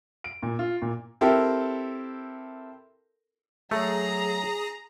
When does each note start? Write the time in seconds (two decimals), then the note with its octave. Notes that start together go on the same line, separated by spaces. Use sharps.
0.24 D7
0.42 A#2
0.59 F4
0.82 A#2
1.21 C4 E4 G4 A4 A#4
3.71 F#3 A3 G#4 A#5